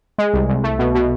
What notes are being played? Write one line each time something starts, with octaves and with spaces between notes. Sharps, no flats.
G#3
C2
C2
A3
B2
B2